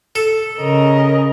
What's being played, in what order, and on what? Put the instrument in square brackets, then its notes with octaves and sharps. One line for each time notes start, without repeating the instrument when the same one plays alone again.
[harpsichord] A4
[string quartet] C#3 A#4 D#5